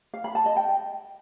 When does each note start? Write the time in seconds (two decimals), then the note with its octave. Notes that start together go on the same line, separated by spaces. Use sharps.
0.14 F5
0.24 B5
0.35 A5
0.46 D#5
0.57 G5